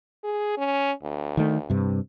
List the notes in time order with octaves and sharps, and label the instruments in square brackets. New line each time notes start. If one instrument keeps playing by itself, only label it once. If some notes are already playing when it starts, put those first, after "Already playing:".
[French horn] G#4
C#4
D2
[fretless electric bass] D#3 A3
G2 C3